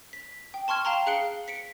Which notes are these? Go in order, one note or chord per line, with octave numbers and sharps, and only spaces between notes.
B6
G5
A5 C6 C#6 F6 G#6
F5 G5 A5 A#5 C6
G#4 F5 F#6 C#7 D7 G7
B6 C#7 D7